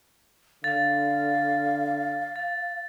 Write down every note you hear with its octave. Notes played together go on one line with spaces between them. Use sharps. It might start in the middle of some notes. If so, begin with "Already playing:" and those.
D3 F5 A6
A6